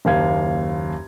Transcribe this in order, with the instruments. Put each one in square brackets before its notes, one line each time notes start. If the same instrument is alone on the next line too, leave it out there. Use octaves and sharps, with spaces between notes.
[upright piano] F#1 D#2 F5 G#6